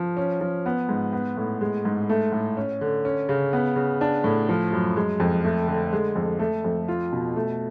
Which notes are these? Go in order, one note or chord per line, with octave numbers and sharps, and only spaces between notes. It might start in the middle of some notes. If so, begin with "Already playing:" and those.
Already playing: F3
C#4
F3
B3
G#2
B3
A2
G#3
G#2
A3
A2
C#4
D3
C#4
C#3
B3
C#3
D4
A2
F3
F#2
G#3
F2
A3
D3
G#3
F2
A3
F2
F4
B2
A3